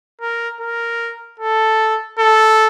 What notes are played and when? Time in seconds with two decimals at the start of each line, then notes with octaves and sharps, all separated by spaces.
0.21 A#4
0.60 A#4
1.40 A4
2.19 A4